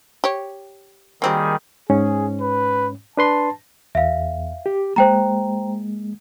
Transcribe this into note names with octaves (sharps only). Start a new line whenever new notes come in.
G4 C#5
D#3 G3 A#3 C4 F#4 G#4
G#2 C#4 G#4
B4
D4 B4 A5 C6
E2 E5 F5
G4
G#3 A#3 C5 G5 A#5